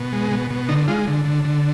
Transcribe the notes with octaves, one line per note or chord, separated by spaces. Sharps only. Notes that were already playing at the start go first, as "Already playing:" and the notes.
Already playing: B2
G#3
B2
B2
D3 D#4
G#3 F4
D3
D3
D3